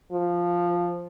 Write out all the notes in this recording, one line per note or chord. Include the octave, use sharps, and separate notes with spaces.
F3